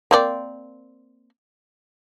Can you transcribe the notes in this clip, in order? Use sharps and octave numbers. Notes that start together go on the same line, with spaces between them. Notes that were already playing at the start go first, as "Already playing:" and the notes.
A#3 C4 D5